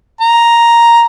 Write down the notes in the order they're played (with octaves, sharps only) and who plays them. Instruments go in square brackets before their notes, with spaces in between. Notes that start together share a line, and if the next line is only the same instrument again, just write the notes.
[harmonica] A#5